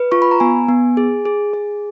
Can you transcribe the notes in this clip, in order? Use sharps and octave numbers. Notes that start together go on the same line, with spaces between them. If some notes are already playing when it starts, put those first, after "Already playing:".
Already playing: B4
F4 C#6
B5
A#5
B3 G#5
B3
G#4
G#4
G#4